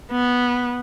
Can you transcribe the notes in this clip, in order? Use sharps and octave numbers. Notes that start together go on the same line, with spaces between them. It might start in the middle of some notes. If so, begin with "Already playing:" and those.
B3